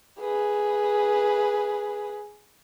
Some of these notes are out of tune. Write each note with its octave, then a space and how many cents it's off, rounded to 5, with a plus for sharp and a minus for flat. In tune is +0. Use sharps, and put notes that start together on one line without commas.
G#4 +0 B4 -5